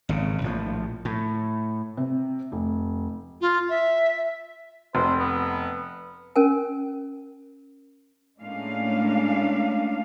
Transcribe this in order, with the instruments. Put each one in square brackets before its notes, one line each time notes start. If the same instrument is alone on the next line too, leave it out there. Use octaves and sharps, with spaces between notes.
[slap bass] G#1 C#3
A#1 A2 F3
A2
[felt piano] C3
F1
[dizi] F4
E5
[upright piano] F1 [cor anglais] C5
[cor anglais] B3
[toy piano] C#4 A#4 G#5
[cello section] A2 G#3 A#3 C#4 D4 F5